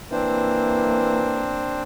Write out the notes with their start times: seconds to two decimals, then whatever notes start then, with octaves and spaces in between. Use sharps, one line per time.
0.12 E3 A#3 C4 D4 C5